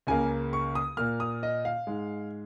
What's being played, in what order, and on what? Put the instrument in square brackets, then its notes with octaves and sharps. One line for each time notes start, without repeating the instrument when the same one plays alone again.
[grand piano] C#2 C#3 A#3 G#5
C#6
D#6
A#2 A#3 F6
D#6
D#5
F5
G#2 G#3